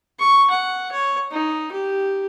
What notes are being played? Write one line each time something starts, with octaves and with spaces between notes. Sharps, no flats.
C#6
F#5
C#5
D#4
G4